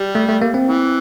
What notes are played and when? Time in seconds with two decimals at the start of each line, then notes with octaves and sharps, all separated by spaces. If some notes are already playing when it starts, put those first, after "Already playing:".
Already playing: G3
0.15 A3
0.28 A3
0.41 A#3
0.54 C4
0.68 E3